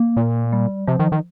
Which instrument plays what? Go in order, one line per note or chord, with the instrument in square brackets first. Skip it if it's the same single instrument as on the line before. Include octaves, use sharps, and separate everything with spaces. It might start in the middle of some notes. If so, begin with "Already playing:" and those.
Already playing: [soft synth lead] A#3
[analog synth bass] A#2
[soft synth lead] G3
[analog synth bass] C3 [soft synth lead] F3
[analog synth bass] D#3
D#3